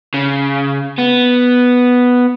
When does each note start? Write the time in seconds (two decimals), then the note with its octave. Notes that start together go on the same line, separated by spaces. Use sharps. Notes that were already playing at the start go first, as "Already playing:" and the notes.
0.14 C#3
0.98 B3